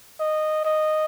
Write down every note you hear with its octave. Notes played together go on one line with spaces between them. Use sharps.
D#5
D#5